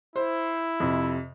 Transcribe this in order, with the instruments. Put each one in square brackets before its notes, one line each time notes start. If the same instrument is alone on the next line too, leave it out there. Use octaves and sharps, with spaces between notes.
[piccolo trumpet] E4 [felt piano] C5
[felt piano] F2 C3